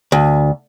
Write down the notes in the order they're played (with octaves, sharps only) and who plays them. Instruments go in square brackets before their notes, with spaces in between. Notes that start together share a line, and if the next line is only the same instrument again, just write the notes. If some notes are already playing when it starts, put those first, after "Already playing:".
[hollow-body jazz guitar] D2